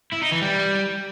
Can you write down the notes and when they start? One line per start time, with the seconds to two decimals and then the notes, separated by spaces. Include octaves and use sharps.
0.13 E4
0.22 D#4
0.32 E3
0.42 G3